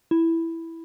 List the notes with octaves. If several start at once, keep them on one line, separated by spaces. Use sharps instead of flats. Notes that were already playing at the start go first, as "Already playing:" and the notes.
E4